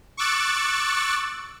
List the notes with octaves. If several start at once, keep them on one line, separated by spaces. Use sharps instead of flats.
C#6 D6 E6 F#6 A6 C#7